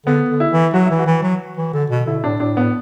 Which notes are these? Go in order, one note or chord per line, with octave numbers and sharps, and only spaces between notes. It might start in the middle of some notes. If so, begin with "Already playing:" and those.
D3 B3
D3
E4
E3
F#3 F#4
E3 E4
F#4
E3
F#3
E3
D3
B2
D3 E4
A2 D4
A2 D4
A2 B3